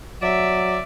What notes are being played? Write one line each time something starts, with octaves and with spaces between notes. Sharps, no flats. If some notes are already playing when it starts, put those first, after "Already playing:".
F#3 D5 E5